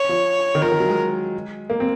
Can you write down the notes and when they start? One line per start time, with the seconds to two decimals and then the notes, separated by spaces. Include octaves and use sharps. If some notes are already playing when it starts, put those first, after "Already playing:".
Already playing: C#5
0.09 F3
0.55 D#3
0.62 F3 A#4
0.72 D#3
0.80 F#3
0.89 G#3
1.70 A#3
1.80 C4